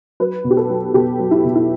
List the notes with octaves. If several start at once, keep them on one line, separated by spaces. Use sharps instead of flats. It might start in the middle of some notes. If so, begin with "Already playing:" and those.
F#3 B4
B2
G4
A4
F#3
B2 G4
F#3
E4
B2
E4